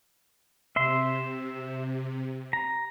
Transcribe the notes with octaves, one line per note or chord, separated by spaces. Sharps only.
C3 E5 C6
A#5